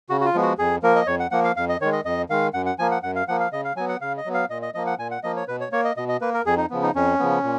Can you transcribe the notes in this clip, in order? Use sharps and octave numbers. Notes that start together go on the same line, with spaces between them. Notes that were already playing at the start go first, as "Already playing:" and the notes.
C#3 F#4
F#4
F4
F3 G#3 B3
F#4
F2 G#4
F3 A#3 A#4
D#5
F2 C#5
F#5
F3 A#3 F#5
F5
F2 F5
D#5
D#3 G#3 C#5
D#5
F2 D#5
D#3 G#3 F5
F#2 F#5
F#5
F3 A#3 G#5
F#5
F#2 F#5
F5
F3 A#3 F#5
F5
C#3 D#5
F5
F#3 B3 G#5
F#5
C#3 F5
D#5
F#3 B3
F5
A#2 D#5
D#5
F3 A#3 D#5
F#5
A#2 G#5
F#5
F3 A#3 D#5
C#5
B2 B4
C#5
A#3 C#5
D#5
B2 D#5
D#5
A#3 B4
A#4
F2 G#4
D#4
C#3 F3 B3
D#4
F2 C#4
C#3 F3 B3
A#2